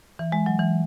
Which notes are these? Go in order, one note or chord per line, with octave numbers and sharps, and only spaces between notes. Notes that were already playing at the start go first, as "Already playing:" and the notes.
E3
G#3
F#3
E3